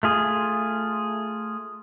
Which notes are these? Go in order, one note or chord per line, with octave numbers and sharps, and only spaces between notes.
A3 F4 G#4